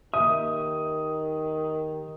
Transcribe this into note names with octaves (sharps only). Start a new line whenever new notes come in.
D#2 D#3 G4 E5 D#6